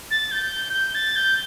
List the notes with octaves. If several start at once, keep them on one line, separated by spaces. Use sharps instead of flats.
A6
G6
G6
A6
G6